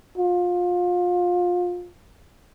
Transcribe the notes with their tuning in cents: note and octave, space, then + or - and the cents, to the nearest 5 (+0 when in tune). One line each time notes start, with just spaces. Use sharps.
F4 +25